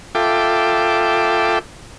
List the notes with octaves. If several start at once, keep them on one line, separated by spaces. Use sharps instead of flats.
F4 A4 E5 G5 D6